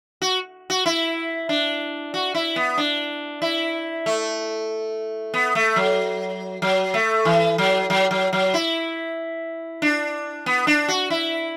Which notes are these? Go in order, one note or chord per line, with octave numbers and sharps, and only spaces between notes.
F#4
F#4
E4
D4
F#4
E4
B3
D4
E4
A3
B3
A3
F#3
F#3
A3
E3
F#3
F#3
F#3
F#3
E4
D4
B3
D4
F#4
E4